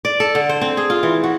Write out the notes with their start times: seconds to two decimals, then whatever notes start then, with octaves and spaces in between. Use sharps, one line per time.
0.05 D5
0.20 A4
0.35 D3
0.49 C5
0.61 C4
0.77 G#4
0.90 F4
1.03 E3
1.24 F#4